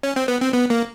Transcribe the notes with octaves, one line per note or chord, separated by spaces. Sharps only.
C#4
C4
B3
C4
B3
A#3